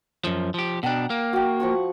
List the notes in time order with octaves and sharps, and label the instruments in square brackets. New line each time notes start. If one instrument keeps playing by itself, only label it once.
[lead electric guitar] F#2 F3
F3 G4
[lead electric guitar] B2 D4 [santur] F#5 G5 A#5
[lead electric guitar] A#3
[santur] F#4 G5
F3 F#5 C#6